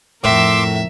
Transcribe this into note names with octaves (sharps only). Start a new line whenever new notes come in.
F2 A2 A#4 E5 C6 D6 E6